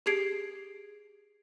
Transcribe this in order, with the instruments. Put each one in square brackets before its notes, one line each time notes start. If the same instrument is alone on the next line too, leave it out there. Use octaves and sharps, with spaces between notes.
[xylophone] G4 G#4 G#6 C7 D7